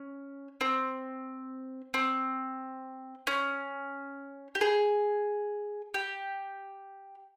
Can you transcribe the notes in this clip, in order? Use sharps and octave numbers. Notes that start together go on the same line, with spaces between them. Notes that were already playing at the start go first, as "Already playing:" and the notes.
Already playing: C#4
C4
C4
C#4
G4
G#4
G4